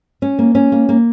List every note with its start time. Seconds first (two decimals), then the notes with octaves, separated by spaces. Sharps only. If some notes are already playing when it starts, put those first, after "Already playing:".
0.22 C#4
0.39 A#3
0.55 C#4
0.72 A#3
0.89 A#3